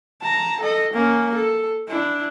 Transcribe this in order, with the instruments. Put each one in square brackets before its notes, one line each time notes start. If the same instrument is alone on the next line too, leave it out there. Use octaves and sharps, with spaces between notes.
[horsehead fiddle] A5 A#5
A4 D#5
A#3 C#4
A4
D4 E4